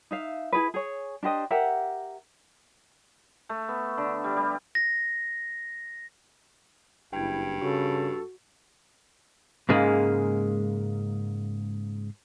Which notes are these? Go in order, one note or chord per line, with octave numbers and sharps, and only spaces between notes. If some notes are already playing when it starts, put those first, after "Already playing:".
D#4 E5 F5
E4 G#4 B4
G#4 C#5
D4 G4 C5 D#5
G4 A#4 E5 F#5
A3
B3
D3
G3
G3
A#6
F#1 G2 E4 G5 G#6
C#3 F#4 A4 C#6
G#2 C#3 G#3 A#3